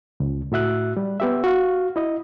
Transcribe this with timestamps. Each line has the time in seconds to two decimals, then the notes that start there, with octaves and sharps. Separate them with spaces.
0.20 C#2
0.52 A2 F#4 E5 F#6
0.97 G3
1.20 B3 G4 E5
1.44 F#4 F5
1.96 E4 D#5